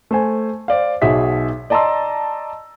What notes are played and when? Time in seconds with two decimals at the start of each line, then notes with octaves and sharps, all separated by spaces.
0.11 A3 C5 G#5
0.68 C5 D5 F5
1.02 B1 B2 D#4 G#4 E5 B6
1.70 D5 D#5 A5 A#5 C6 E6